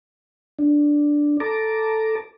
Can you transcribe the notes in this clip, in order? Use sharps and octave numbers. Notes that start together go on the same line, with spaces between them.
D4
A4 A5 A#5 D6